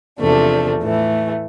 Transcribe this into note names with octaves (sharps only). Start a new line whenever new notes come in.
E2 C3 F3 A3 D4
A2 E3 A3